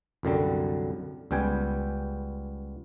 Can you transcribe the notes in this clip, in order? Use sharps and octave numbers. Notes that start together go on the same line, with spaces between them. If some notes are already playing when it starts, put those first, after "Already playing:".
C2 F#2 D3 G3
C#2 G3 B3 G5 G#5